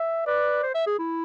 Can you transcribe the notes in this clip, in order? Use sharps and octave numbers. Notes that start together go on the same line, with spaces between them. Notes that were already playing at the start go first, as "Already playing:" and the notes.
Already playing: E5
B4 D5
C5
E5
G#4
E4